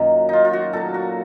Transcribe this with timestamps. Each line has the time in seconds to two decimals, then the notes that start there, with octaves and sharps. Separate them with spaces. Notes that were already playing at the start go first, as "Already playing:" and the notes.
Already playing: F#2 A#2 D#3 F#3
0.29 D#4 F4
0.45 F4
0.53 F#4
0.73 A#2 F#3 A4
0.94 F#4